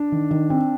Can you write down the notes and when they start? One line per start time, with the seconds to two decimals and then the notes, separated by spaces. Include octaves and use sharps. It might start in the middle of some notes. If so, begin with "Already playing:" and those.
Already playing: D4
0.12 D#3
0.31 D#3
0.50 C4